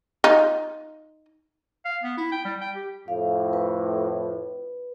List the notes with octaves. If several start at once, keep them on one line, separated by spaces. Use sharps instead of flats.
D#4 F4
F5
B3
E4
G5
G3
G5
G4
F2 A2 F5
B4